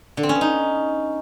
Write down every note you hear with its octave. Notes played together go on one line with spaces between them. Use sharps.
D3
C4
C#4
B3
D#4